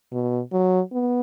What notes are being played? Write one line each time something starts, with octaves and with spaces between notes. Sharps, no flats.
B2
F#3
B3